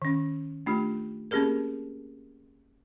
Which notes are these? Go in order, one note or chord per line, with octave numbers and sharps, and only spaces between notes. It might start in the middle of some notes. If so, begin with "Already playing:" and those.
D#3 C#4
A3 D4 F4 G4
A#3 C4 C#4 G4 G#4 A#4